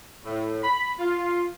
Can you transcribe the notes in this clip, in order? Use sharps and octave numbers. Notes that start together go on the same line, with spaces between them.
A2
B5
F4